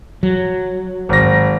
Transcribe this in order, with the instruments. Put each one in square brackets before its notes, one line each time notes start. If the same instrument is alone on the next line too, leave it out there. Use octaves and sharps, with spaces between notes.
[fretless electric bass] F#3
[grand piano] G#1 A#6